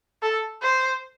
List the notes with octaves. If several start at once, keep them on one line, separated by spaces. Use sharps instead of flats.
A4
C5